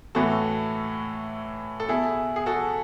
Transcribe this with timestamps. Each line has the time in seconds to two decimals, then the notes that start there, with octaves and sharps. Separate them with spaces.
0.15 A2 E3 F#4 A4
1.80 A4
1.88 B2 E4 G#4
2.36 G#4
2.46 F#4 A4